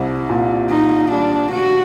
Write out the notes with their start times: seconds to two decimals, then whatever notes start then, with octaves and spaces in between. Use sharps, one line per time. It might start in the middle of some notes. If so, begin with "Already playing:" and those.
Already playing: C2 C3 E4
0.29 A#2
0.70 A#2 D#4
1.11 G3 D4
1.52 B2 F#4